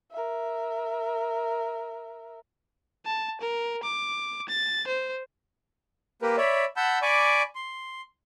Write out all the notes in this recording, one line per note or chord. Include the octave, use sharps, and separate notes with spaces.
A#4 E5
A5
A#4
D6
A6
C5
A#3 G4 A#4 B4
C#5 D5 E5 B5
F#5 A5 B5 E6 G6
D5 G#5 B5 C#6 D6
C6